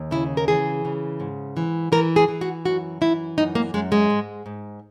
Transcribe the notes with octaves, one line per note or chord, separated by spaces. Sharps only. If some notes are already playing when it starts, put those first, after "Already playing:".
Already playing: D#2
C#3 E4
A#4
E3 G#4
C#3
G#2
E3
E3 A#4
G#4
E3
F#4
F#2 F#4
E3 E4
F#2 D#4
A#3
F#2 G#3
G#3
G#2
G#2